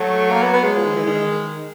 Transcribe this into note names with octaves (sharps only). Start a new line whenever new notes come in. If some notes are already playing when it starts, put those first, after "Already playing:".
Already playing: F#3 A3
A#3
B3
B3
G#3
F3
D#3
E3
D#3